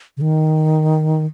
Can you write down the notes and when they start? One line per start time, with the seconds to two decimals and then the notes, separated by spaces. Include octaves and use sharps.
0.17 C#3
0.21 D#3